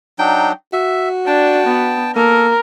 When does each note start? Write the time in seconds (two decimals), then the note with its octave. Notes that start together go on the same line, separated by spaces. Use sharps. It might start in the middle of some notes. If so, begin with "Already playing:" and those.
0.19 F#3 D4 D#4 G5
0.73 F#4 E5
1.27 D4 G5 A5
1.66 B3
2.16 A#3 A4 A#4